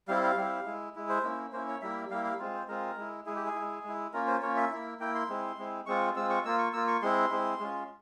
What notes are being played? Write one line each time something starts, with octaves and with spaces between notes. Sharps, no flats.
G3 C4 E4 F5
F5
G3 C4 E4
G#3 E4
G#3 E4
C5
A#3 C#4 E4
A#3 C#4 E4 C5
C#5
G3 A#3 E4 E5
G3 A#3 E4 F5
F5
G#3 C4 F4
C5
G#3 C4 F4 A#4
G#3 E4
G#3 E4 G#4
G4
G#4
G#3 E4
G#3 E4
A#3 C#4 F4 A#4
C5
A#3 C#4 F4 C#5
E5
A#3 E4
A#3 E4 G5
C6
G#3 C4 E4
G#3 C4 E4
G#3 C4 F4 C#6
G#3 C4 F4 E6
C#6
A#3 F4 E6
C#6
A#3 F4 E6
C#6
G#3 C4 E4 C6
G#3 C4 E4
G#3 C#4 F4